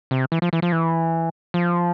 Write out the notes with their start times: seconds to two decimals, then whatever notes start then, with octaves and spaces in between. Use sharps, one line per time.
0.11 C3
0.32 E3
0.42 F3
0.53 E3
0.62 F3
0.72 E3
1.54 F3